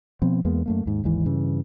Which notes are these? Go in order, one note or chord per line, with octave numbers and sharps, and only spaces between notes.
B2 F3 B3 C4
E2 G#3 A#3 B3
F#2 A3 A#3
D#2 G#2
G#1 D#2 G#2 E3
G2 C#3 E3